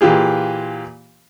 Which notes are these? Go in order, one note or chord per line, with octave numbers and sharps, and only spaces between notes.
A#2 E3 F4 G4 G#4